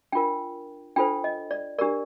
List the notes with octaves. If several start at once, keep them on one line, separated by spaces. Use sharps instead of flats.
D4 F4 A#4 G5
D4 F4 A4 C5 G5
D#5
D5
D4 G4 A#4 D5